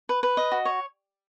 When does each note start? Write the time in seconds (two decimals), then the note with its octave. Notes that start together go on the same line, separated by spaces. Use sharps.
0.09 B4
0.23 B4
0.37 D#5
0.52 F#4
0.65 C#5